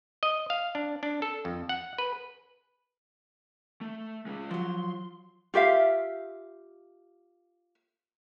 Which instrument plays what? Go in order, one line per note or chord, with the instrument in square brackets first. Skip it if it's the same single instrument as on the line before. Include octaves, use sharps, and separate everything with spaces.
[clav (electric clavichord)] D#5
F5
D4
D4
A4
F2
F#5
B4
[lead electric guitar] A3
G#3 C#4
[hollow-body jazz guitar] F3 F#3 [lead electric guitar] C6
[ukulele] F4 G4 E5 F5